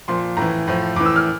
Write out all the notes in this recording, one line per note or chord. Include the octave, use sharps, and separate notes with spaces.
A#2 F3 C6
A2 E3 A#5
A2 F3
A2 E3 D6
E6
F6